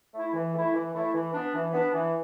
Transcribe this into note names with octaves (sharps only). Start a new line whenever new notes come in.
A3 E4
E3
A3 E4
E3
A3 E4
E3
B3 D4
E3
B3 D4
E3